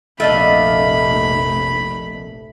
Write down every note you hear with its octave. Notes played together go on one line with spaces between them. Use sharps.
F1 A#1 A3 D4 D#5 F5 B5